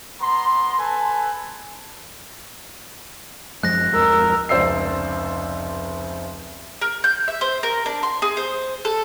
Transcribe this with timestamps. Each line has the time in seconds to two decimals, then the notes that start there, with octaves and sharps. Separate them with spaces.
0.21 B3 A#5 C6
0.79 A4 B4 G#5 A5
3.63 F#2 F3 G#3 F#6 A#6
3.93 D1 F2 G#3 A#4 E6
4.49 F1 C#2 C5 D5 E6 C7
6.81 A#4
7.04 G6
7.28 E5
7.41 C5
7.63 A#4
7.86 D4
8.03 C6
8.22 G#4
8.37 C5
8.85 A4